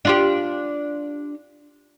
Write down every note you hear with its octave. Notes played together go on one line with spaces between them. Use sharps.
D4 F4 G4